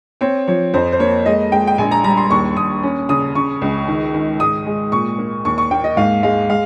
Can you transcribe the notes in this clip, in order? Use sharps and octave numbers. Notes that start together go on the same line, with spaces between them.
C4 C#5
F3 C#5
F2 C5
C5
A#3 C#5
G#3 D#5
G#3 G5
G5
A#1 G#5
A#5
G3 A#5
C6
D#2 C#6
D#2 D#6
C#4
C#3 D#6
C#3 C#6
C#2
D#3
D#3
G#2 D#6
G#3
A#2 C#6
A#3
D#2 C#6
C#6
A#3 G5
D#5
G#2 F5
G#3 F5
G#3 F5